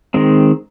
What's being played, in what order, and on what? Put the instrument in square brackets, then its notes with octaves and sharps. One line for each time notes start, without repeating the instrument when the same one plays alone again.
[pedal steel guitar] D#3 G#3 C4